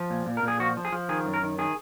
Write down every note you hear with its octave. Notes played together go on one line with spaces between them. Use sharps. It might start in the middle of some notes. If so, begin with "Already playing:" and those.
Already playing: F3
A#2
A#2
A#4
A#2
G#4
F3 F#4
F3
G#4
F3
D#3 G#4
F#2
A#4
D#3
D#3 G#4